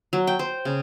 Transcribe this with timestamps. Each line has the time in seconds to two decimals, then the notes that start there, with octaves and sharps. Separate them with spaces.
0.13 F#3
0.27 G5
0.39 C5
0.65 C#3